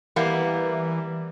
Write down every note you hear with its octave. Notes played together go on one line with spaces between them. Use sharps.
E3 G3 A#3 B3